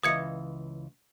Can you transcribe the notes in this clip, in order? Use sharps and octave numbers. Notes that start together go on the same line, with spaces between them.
C#2 E3 D#5 D#6 G#6 C#7